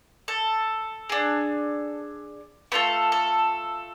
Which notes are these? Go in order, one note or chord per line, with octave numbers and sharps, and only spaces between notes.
A4
D4 G#4
A3 F4 A4 B4
A4